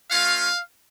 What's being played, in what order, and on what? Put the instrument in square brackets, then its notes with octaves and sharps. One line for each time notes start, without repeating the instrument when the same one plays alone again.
[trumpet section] A3 C#4 F4 F5